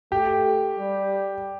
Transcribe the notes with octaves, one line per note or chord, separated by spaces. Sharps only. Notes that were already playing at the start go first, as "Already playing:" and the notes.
A3 G4
G3